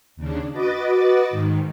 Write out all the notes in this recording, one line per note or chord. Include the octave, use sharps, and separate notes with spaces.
D#2 C#3 D4
F#4 B4 D#5 D6 A6
G#2 D#3